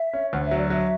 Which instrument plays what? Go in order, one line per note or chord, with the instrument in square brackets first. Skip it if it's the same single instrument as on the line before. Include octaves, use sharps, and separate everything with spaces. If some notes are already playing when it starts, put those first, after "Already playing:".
Already playing: [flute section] E5
[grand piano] C#4
[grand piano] D2 [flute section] F#5
[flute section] E5
[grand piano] F#3
[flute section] D5
[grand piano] F#3 [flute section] E5